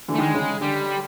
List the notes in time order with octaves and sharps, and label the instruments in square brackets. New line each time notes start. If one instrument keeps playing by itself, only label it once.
[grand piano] D3 E3
[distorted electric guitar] A3
[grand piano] D#3 [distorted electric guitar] G#3
[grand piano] D3
C#3
[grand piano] D3 [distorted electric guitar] G3